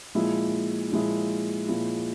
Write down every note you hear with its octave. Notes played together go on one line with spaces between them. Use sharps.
A#2 F3 G#3 E4
A#2 F3 G#3 E4
A#2 F3 G#3 E4